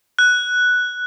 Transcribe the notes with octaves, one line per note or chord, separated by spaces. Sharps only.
F#6